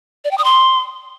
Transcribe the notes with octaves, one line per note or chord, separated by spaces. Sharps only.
D5
G5
D#6
C6